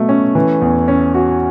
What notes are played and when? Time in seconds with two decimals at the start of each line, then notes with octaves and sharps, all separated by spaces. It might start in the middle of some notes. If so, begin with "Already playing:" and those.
Already playing: B2 F#3 A3
0.09 C#4
0.35 E3
0.62 E2
0.88 C#4
1.15 F#4